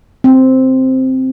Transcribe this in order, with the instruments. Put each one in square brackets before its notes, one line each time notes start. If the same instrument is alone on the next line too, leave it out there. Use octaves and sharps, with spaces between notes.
[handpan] C4